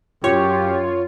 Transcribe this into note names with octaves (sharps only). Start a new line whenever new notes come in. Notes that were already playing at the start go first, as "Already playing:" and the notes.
F#2 F4 G4 C#5